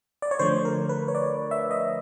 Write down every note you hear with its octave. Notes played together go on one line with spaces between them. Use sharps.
D5
C#5
D3 F3 A3 C5
A#4
B4
C#5
D5
E5
D#5